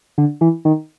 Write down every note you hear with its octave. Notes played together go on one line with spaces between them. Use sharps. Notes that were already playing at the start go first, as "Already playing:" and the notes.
D3
E3
D#3